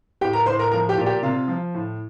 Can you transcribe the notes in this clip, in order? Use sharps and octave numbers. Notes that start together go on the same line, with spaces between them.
A2 G4 G5
A#4 A#5
A2 C5 C6
A#4 A#5
F3 A#4 A#5
G4 G5
A#2
G4 G5
C3 F4 F5
F3
A2